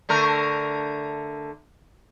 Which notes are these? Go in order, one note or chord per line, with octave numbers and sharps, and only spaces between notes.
D3 A3 A#4